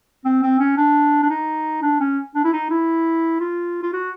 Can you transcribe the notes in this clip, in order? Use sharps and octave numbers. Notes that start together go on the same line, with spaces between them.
C4
C4
C#4
D4
D4
D#4
D4
C#4
D4
E4
D#4
E4
F4
F4
F#4